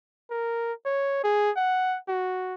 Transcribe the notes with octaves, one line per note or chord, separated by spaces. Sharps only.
A#4
C#5
G#4
F#5
F#4